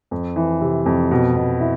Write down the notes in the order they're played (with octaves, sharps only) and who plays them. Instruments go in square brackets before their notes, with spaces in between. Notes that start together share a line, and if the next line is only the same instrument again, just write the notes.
[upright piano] F2
E3
C3
F2
B2
B2
E4